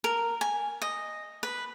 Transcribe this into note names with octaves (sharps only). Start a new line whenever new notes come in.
A#4
G#5
D#5
B4